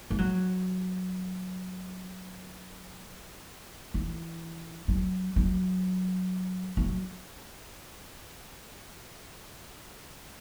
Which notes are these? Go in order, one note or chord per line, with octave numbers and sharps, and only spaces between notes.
G#3
F#3
E3
F#3
F#3
F#3